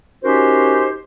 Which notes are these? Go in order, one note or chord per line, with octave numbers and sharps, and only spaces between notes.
C#4 D#4 F#4 G4 A#4 C5